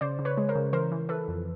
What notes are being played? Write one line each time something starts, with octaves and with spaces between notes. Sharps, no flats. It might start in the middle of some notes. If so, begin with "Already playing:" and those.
C#3 C5 D5
C#3
B4 C#5
G#3
A#4 C5
C#3
E3 A#4 C5
E3
E3 A4 B4
F2